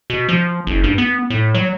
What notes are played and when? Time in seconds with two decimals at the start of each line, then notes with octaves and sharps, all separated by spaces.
0.10 B2
0.28 F3
0.67 F#1
0.84 G2
0.98 B3
1.30 A2
1.54 F#3